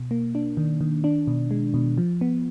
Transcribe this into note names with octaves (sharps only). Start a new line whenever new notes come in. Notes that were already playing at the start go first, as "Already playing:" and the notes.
Already playing: B2
A#3
D4
D#3
D#3
D4
B2
G#3
B2
F3
B3